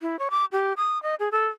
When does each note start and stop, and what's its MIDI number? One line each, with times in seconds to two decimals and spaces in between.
0.01 0.19 64
0.19 0.28 73
0.30 0.45 86
0.52 0.73 67
0.77 1.01 87
1.03 1.15 75
1.19 1.29 68
1.32 1.48 69